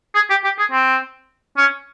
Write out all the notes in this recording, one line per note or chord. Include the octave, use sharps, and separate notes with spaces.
G#4
G4
G4
G#4
C4
C#4